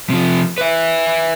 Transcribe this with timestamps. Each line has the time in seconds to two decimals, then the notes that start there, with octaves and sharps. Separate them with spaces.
0.10 C3 F3
0.58 B4 E5